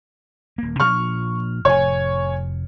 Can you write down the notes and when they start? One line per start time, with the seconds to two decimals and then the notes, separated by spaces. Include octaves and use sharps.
0.58 D#1 A#3
0.80 A#2 F3 D4 C#6 F6
1.65 F1 A2 C#5 G#5